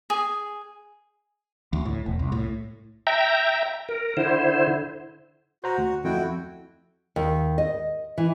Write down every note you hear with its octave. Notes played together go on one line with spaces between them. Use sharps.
G#4
D2
A2
E1
C2
A2
E5 G5 A#5
A#4
D3 E4 C5
F#4 C5 A#5
D2
F2 E4 F#4 G5
D#2
D#5
E3